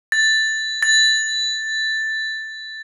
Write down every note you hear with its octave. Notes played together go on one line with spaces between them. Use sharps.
A6
A6